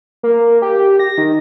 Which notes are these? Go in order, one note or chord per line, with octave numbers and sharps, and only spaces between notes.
A#3
G4
A#6
D#3